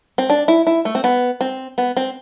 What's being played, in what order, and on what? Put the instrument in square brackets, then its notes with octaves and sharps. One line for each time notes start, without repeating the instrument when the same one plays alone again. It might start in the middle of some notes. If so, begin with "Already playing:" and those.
[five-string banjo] C4
D4
E4
E4
A3
C4
B3
C4
B3
C4